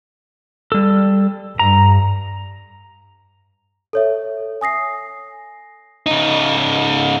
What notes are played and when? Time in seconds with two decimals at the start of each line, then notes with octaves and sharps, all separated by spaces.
0.72 G3 A4
1.59 G2 A#5
3.93 A4 C#5 E5
4.61 G#5 D#6 A#6 C7
6.06 C#3 D#4